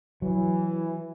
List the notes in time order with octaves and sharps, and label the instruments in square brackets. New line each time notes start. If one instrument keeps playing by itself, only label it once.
[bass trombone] E3 [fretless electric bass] F#3